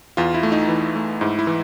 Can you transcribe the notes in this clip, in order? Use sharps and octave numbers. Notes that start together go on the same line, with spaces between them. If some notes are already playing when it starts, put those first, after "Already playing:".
E2 F4
E4
A3
D#4
E3
A3
G#2 E4
E4
E3